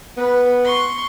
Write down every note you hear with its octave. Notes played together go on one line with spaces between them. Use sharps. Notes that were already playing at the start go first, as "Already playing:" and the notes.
B3 B4
C6 C#6